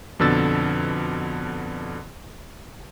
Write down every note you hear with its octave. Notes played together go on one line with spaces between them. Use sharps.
F2 B2 D3 E6 A6